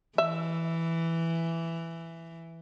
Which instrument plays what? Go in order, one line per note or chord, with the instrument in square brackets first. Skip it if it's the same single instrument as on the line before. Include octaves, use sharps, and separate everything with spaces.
[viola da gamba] E3 [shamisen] E5